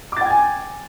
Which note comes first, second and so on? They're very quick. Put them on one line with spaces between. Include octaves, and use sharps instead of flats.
D6 A6 G5 G#6 G#5